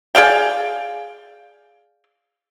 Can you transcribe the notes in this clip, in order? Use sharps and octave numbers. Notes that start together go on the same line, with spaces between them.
G#4 D5 F5 G5